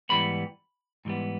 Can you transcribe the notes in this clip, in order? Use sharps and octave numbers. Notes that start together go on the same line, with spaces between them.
G#2 E3 G3 B3 B5
G#2 E3 G3 B3